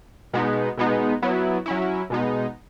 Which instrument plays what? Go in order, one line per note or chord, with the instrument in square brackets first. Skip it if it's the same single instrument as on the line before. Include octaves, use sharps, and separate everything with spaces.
[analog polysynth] B2 G#3 B3 D#4
B2 G#3 B3 D#4
F#3 B3 E4
F#3 C#4 E4
B2 G#3 B3 D#4